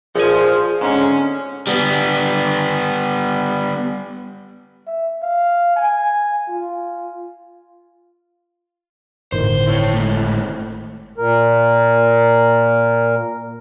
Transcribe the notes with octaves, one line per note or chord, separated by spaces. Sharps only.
A#1 F3 G#4 G#5
G#2 D3 G#3 C#4
G3 B3
E5
F5
G#5
F4
G1 A2 D#3 C5
E4 C#5
G#2 A3
A#2 A#4